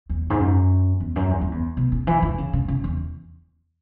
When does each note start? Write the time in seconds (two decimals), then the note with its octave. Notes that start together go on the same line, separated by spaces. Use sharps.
0.09 E2
0.30 G#2
0.40 F#2
1.00 E2
1.16 F#2
1.31 E2
1.41 F#2
1.52 E2
1.77 B2
1.92 C#3
2.07 E3
2.22 D3
2.38 C#3
2.53 C#3
2.68 C#3
2.84 E2